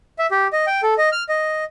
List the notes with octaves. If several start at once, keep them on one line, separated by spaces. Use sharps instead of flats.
E5
G4
D#5
G5
A4
D#5
F6
D#5